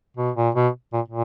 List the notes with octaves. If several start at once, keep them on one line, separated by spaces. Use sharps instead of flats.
B2
A#2
B2
A#2
A#2